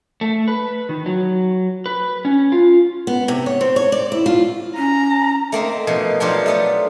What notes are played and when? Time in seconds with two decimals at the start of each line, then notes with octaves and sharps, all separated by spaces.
0.21 A3
0.48 B4
0.89 D#3
1.06 F#3
1.86 B4
2.25 C#4
2.52 F4
3.07 B3
3.28 C3
3.46 C#5
3.61 C4
3.76 C#5
3.92 D5
4.12 E4
4.26 F4
4.77 C#4 A#5
5.52 A3 A#3 C4 D#4
5.87 B2 F3
6.20 B2 F3 F#3 D4 F4 G4
6.46 A3 B3 A4